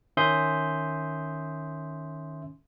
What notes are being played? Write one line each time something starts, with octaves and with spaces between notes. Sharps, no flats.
D#3 C#4 E5 C6 D#6 G6